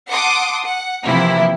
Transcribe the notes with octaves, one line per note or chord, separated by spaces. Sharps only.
F#5 A5 C6 D6 D#6
F#5
C3 E3 F3 A#3 E4 G4